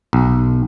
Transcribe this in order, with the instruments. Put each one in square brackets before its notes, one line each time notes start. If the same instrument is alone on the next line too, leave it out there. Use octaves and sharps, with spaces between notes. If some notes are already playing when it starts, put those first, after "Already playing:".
[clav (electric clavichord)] B1